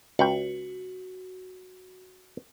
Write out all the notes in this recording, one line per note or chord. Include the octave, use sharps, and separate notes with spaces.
C#2 F#4 G5